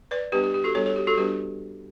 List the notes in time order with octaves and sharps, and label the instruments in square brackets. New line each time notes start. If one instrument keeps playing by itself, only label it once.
[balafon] B4 D5
G3 B3 D4 G4 B4
G4
G4
F#4 A4
G3 B3 D4 A4 C#5
A4 C#5
G4
F#4 A4
G3 B3 D4 G4 B4